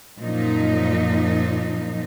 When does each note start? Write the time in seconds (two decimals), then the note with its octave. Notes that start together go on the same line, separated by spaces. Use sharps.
0.20 F#2 A#2 F3 D#4